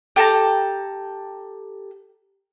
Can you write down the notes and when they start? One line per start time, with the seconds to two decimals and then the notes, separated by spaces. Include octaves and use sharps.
0.16 G4 A4 A5 A#5